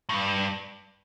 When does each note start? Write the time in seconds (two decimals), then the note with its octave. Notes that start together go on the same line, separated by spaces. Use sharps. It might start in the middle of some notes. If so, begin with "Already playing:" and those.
0.09 A2
0.14 G2